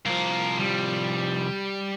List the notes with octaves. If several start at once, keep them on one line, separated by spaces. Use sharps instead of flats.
C2 F3 F5 A#5
G3